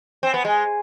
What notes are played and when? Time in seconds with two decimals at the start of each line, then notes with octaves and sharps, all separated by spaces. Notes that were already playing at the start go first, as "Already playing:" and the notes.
0.23 C4
0.34 B3
0.45 G#3